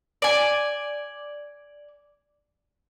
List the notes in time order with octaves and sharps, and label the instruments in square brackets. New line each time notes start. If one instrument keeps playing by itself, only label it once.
[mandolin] D5 G#5